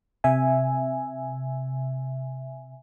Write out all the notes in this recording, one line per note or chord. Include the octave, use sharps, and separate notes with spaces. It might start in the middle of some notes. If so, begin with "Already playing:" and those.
C3 E5 G#5